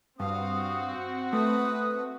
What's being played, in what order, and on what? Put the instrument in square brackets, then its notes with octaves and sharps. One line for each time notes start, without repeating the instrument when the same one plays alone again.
[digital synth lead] G2 [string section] C4 F#4 [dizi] F5 [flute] D#6
[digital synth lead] A3 [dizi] B4 [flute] D#6